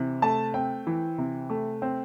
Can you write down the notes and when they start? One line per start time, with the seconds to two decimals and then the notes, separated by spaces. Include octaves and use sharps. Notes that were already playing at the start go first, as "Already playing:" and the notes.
Already playing: C3 E3
0.22 A3 A5
0.54 C4 G5
0.87 E3
1.18 C3
1.50 A3
1.82 C4